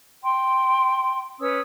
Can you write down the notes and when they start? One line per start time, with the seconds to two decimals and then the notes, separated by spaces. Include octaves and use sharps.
0.23 G5 C6
1.40 C#4 B4 D#6 E6